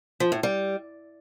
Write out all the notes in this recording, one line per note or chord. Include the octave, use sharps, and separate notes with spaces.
F3
A2
G3